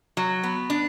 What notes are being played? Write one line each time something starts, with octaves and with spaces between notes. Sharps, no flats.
F#3
B3
D4